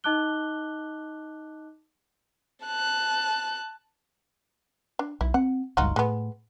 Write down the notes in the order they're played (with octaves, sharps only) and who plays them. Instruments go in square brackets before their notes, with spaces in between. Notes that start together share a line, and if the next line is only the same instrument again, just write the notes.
[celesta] D#4 D#5 A5 D6 F#6 G7
[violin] A5 F#6
[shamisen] D4
[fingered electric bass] B1 [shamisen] E4
[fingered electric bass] C4 [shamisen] F#5
[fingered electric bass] F#1 C#2 G2 [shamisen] D#4 F4 F#4
[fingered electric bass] A2 [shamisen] G#3 B3